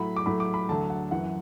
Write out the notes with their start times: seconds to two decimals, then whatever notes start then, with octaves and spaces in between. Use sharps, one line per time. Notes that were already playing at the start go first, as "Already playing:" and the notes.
Already playing: A2 F#3 B5
0.16 D6
0.26 A2 F#3 B5
0.40 D6
0.54 B5
0.69 D2 D3 F#3 A5
0.90 F#5
1.11 F#2 E3 F#5